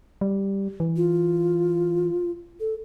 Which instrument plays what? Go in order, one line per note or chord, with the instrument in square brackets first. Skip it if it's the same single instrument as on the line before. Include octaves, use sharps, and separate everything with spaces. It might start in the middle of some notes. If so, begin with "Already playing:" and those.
[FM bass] G3
E3
[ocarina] F4
A4